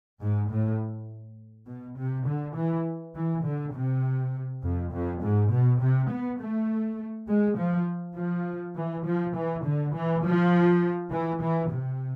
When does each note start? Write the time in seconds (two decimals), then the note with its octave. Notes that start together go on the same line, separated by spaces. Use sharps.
0.21 G#2
0.50 A2
1.67 B2
1.98 C3
2.26 D3
2.56 E3
3.15 E3
3.45 D3
3.74 C3
4.63 F2
4.92 F2
5.21 G#2
5.51 B2
5.81 C3
6.10 B3
6.40 A3
7.28 G#3
7.58 F3
8.16 F3
8.76 E3
9.05 F3
9.35 E3
9.64 D3
9.94 E3
10.24 F3
11.12 E3
11.41 E3
11.71 C3